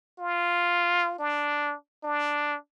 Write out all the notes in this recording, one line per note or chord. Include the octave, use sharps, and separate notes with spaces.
F4
D4
D4